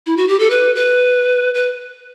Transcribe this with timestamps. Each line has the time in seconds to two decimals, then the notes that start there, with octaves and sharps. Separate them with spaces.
0.06 E4
0.17 F#4
0.28 G4
0.40 A4
0.50 B4
0.76 B4
1.54 B4